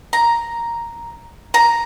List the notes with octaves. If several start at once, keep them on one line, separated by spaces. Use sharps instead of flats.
A#5
A#5